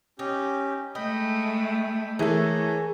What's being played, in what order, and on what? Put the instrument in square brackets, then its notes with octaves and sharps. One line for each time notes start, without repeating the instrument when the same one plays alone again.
[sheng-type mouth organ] C#4 G4 [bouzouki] D#4
[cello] G#3 A3 [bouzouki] D#5 [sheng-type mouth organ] G5 B5
[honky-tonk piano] E3 A3 A#3 [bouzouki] G#4 A4 [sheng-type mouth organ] C#5 G#5 A#5